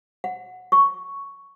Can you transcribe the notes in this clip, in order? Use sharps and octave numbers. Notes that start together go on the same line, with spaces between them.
F#5
C#6